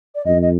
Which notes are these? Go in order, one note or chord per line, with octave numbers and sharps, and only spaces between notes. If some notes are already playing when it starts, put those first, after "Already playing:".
D5
F2 D#5
D#5